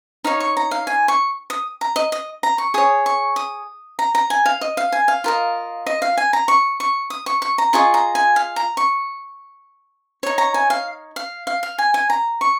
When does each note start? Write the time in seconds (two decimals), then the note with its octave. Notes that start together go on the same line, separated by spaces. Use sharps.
0.24 D#4 C#5 F5
0.40 C#6
0.57 A#5
0.71 F5
0.87 G#5
1.08 C#6
1.50 D#6
1.81 A#5
1.96 D#5
2.12 D#5
2.43 A#5
2.58 C#6
2.74 G#4 C#5 D#6
3.06 C#6
3.36 D#6
3.99 A#5
4.15 A#5
4.30 G#5
4.46 F5
4.61 D#5
4.77 F5
4.92 G#5
5.08 F5
5.24 F4 A#4 D#5
5.86 D#5
6.02 F5
6.17 G#5
6.33 A#5
6.48 C#6
6.80 C#6
7.10 D#6
7.26 C#6
7.42 C#6
7.58 A#5
7.73 F4 G#4 D#5 C#6
7.94 A#5
8.15 G#5
8.36 F5
8.56 A#5
8.77 C#6
10.23 D#4 C#5 C#6
10.38 A#5
10.54 G#5
10.70 F5
11.16 F5
11.47 F5
11.63 F5
11.78 G#5
11.94 G#5
12.10 A#5
12.41 C#6